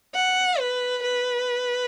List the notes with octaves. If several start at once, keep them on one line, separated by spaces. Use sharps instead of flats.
F#5
B4
B4